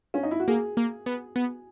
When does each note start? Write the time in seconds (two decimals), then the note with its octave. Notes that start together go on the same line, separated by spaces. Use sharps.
0.14 C#4
0.23 D#4
0.31 E4
0.40 F#4
0.48 A#3 G#4
0.77 A#3
1.06 B3
1.36 B3